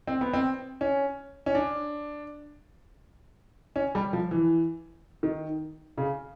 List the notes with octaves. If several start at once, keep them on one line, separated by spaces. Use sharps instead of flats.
C4
B3
C4
C#4
C#4
D4
C#4
G3
F3
E3
D#3
C#3